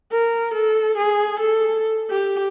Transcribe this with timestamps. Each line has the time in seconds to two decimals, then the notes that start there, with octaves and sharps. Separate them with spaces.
0.11 A#4
0.53 A4
0.97 G#4
1.39 A4
2.09 G4